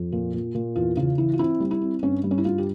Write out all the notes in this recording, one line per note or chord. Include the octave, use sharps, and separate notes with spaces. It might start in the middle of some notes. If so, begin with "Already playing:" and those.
Already playing: F2
A#2
A#2
A#2
E2 F4
C#3 F4
E3 E4
F4
C4 E4
G3
E4
C4
G2 C#4
G3
C#4
E4
G2 F4
G4